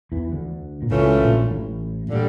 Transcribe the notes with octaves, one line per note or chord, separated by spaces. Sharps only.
E2 E3
D2 D3
A#2
C#2 C#3 E3 A3 C#4 F4
A#1 A#2
A1 A2
A#2 D3 G3